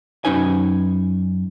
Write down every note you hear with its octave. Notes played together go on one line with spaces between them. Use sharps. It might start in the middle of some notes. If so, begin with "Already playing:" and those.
F#2 C#4 D#4 B4 G#5